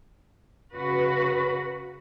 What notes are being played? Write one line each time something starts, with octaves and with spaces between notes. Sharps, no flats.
C#3 F#4 B4